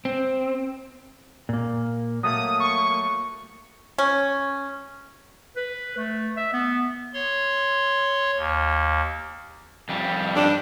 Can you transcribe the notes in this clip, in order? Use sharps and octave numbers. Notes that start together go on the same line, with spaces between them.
C4
A#2 A#3
F#3 A3 A#3 D#6
C#6
C#4
B4
A3
E5
B3
C#5 C6
D#2
F2 G3
G2 D4